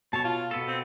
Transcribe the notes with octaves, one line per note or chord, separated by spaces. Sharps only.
B2 C#5 A5
F4
B2 B3 A4
C4